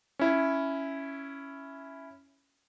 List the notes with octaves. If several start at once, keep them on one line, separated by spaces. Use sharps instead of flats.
C#4 E4